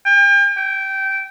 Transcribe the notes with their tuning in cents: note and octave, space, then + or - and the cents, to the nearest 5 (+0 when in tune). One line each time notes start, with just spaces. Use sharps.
G5 +40
G5 -15